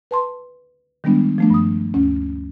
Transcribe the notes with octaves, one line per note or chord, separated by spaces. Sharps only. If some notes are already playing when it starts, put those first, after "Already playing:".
B4 A5 C6
D#3 G3 G#3 B3 D4
F3 A3 D4
G2 D#6
D2 C#4